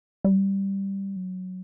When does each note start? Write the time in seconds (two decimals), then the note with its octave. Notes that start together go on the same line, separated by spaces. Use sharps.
0.24 G3
1.16 F#3